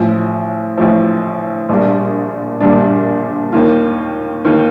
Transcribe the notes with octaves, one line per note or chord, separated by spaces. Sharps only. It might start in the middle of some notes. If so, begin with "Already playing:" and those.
Already playing: A1 A2 F3
A1 A2 F3
A#1 A#2 G3 D4
A#1 A#2 G3 D4
D#2 D#3 A#3 F4
D#2 D#3 A#3 F4